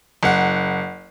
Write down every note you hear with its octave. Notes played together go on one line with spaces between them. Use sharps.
F#1 F#5